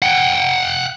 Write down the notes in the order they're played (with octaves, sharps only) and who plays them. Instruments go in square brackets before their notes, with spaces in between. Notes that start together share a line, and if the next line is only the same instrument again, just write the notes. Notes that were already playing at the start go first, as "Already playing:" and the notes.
[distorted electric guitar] F#5 G5